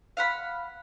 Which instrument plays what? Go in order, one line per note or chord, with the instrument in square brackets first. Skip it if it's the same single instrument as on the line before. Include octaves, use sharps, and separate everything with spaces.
[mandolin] F5 F#5 B5